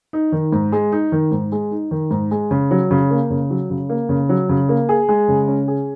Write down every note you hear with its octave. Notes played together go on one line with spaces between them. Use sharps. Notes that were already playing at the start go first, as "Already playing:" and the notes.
D#4
D#3
G#2
G#3
D#4
D#3
G#2
G#3
D#4
D#3
G#2
G#3
C#3
F#3
C#3
A#3
C#3
F#3
C#3
A#3
C#3
F#3
C#3
A#3
G#4
G#3
C#3
C#4
G#4